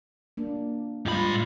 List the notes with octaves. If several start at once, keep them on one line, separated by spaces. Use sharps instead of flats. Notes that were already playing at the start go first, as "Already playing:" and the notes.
A#3 D4
G#2 G3 F4 B5